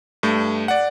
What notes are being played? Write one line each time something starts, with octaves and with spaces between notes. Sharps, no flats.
G2 A3
D5 F#5